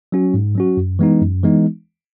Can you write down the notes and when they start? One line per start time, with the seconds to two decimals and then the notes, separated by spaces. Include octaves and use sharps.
0.12 F#3 C#4 F#4
0.34 G#2
0.55 F#3 C#4 F#4
0.77 F#2
0.99 E3 G#3 B3 D#4
1.22 F#2
1.43 E3 G#3 B3 D#4